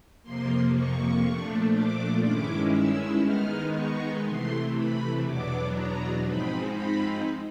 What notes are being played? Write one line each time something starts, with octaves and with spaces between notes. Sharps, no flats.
F2 C3 F3 A#3 C6
C#6
A#2 F3 A3 D4
D6
G2 D#3 G#3 C#4 E4 D6
E6
D#3 G#3 B3 D#4 F6
C#6
C3 E3 A3 C6
B5
E2 B2 F#3 B3 D4 D6
A#5
G#2 F3 G#3 C4 D#4 B5
B5